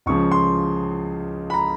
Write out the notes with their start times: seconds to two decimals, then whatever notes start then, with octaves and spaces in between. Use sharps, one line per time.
0.06 C#2 C#3 F3 C#6
0.32 C6
1.50 B5
1.54 A#5